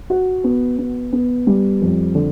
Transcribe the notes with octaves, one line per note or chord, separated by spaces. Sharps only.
F#4
B3
B3
B3
G3
F2
D3